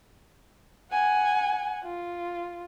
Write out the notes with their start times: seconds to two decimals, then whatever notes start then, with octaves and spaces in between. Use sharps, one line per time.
0.91 F#5 G#5
1.84 F4